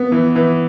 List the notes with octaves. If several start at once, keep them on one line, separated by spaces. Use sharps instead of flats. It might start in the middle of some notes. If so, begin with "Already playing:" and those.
Already playing: B3
E3
E3